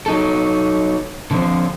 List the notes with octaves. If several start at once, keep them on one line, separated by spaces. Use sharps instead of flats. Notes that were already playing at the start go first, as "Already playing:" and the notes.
F#3 D#4 A4
D3 F3 C4